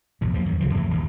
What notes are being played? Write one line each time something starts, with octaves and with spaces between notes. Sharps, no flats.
A#1 E2 G2
E2 F3 F#3 A#3
F#2 D#3
C2 C#3 F3
F2 E3 A3
D#1 G2 D#3